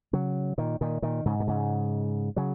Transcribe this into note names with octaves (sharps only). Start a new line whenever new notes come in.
C#3 F#3
A#2 D#3
A#2 D#3
A#2 D#3
G#2 C#3
A#2
G#2 C#3
C#3 F#3